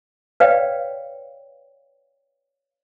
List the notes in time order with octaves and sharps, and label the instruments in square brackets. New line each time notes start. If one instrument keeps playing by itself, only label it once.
[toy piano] B4 C#5 D5 F5 G5